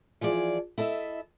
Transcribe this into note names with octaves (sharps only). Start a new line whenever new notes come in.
E3 F3 G#4 D5
E4 A4 D#5 E5